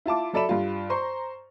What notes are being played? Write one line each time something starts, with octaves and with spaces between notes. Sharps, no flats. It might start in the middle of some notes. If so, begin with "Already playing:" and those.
E4 F4 A5 D6
F#3 A4 D5 E5 B5 E7
G2 F4
C5 A#5 C6 C#6